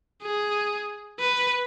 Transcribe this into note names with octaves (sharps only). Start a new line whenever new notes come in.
G#4
B4